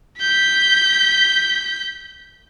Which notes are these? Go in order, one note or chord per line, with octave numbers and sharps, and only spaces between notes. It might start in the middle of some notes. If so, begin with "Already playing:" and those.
G6 B6